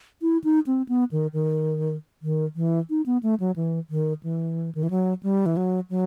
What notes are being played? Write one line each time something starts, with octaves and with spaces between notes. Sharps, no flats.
E4
D#4
C4
B3
D#3
D#3
D#3
E3
D#4
B3
A3
F#3
E3
D#3
E3
D#3
E3
F#3
G3
E3
F#3
F#3